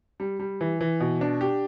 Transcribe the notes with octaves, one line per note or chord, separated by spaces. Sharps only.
G3
G3
E3
E3
B2
D4
G4